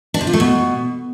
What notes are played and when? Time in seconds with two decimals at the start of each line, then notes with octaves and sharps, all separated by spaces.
0.14 D4
0.21 C3
0.27 F4
0.33 A3
0.40 B2